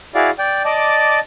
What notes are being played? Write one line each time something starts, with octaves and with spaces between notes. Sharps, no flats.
E4 F#4 G#4 D5 F5
D5 G5
D5 D#5 A5 D6